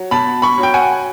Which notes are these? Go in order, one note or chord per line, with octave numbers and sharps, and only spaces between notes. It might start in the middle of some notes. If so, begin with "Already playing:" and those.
Already playing: F#3
B2 A5 B5
B5 C#6
F#3
G5
F#5 G#5